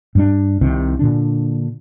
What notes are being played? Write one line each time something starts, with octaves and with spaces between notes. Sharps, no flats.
G2 G3 D4
C2 C3 D#3
A#2 D3 D4